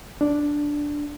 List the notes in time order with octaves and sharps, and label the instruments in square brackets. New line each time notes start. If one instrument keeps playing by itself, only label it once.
[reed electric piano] D4